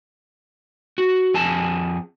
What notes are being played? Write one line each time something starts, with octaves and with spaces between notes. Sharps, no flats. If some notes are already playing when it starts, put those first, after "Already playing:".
F#4
F2 G#4 A5